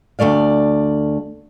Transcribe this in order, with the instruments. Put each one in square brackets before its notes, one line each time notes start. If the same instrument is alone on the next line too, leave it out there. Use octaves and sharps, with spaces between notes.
[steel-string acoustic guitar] D2 E3 A3 D5 F5